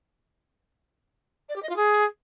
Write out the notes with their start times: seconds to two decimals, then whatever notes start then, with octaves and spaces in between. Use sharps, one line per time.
1.49 D5
1.55 G4
1.62 D#5
1.69 F4
1.76 G#4